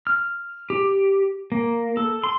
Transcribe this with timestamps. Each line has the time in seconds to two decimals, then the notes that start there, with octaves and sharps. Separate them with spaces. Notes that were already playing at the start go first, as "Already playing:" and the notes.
0.07 F6
0.70 G4
1.52 A#3
1.97 A4
2.24 C6